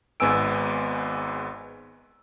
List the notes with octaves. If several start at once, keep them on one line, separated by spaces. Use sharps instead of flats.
G#1 G#2 B3 G#5 E6 D7